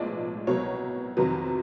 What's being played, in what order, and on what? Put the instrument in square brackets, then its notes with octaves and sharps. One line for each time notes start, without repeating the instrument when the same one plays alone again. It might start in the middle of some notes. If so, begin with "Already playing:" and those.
Already playing: [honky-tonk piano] B1 A2 F3 G#3 B3 D5
C2 B2 F#3 A#3 C#5
F2 C3 D#3 F#3 B4